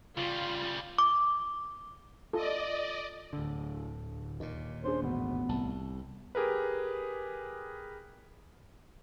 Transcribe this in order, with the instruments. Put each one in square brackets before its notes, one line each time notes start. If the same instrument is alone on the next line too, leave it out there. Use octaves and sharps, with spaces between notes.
[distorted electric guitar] C#3 G3 [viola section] F4
[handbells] D6
[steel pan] F4 A4 [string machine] D5 D#5
[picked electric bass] D1 D3
[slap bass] D#2 A#2 [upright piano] D#4
[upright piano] C#4 D4 G#4 [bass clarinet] C5
[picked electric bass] A1 [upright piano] G#2 B2 [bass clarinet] B3
[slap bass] C2 [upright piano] A5
[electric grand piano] G4 G#4 A#4 B4